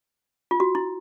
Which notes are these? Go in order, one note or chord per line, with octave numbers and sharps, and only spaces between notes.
F4
F#4
E4